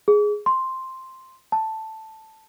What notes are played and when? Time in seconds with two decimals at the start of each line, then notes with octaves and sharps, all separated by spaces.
0.08 G#4
0.46 C6
1.52 A5